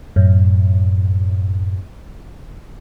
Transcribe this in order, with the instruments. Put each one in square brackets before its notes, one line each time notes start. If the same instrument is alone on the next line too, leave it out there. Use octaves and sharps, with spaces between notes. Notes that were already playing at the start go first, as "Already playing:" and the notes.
[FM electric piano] F#2 A2